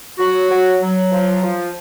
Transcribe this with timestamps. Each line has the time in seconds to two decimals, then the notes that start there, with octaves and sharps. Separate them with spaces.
0.19 F#3 F#4
0.50 F#3
0.81 F#3
1.12 F3
1.42 F3